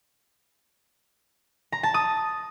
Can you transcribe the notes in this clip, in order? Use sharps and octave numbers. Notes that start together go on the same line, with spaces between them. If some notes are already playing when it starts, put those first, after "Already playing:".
A#5
A5
D#6